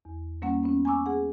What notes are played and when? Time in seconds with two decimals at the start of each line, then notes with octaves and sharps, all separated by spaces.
0.05 E2
0.42 G3 A#3 C#4 F#5
0.64 B3 C#4
0.85 G#5 A#5 C#6 D6 E6
1.06 G#4 F#5